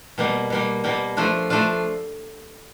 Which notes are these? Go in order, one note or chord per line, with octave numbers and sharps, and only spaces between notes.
B2 G3 A#3
B2 G3 A#3
B2 G3 A#3
F3 A3 D4 F4
F3 A3 D4 F4